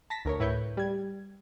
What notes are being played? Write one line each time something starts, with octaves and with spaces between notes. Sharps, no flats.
A5 A#6 B6
D2 A#4 C#5
A2 E4 B4 C#5 C#6 G6
G3 G#6